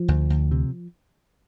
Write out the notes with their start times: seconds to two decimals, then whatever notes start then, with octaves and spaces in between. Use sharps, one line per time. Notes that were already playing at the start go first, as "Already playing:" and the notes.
Already playing: F3
0.08 D2
0.30 D2
0.51 C3